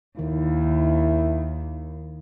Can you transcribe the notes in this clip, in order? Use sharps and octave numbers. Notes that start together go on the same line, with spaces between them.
D#2 D#3 E4